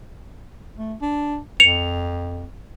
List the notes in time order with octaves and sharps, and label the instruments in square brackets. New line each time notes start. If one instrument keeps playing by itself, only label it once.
[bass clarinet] A3
D4
[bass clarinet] F2 [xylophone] C#7 [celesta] F7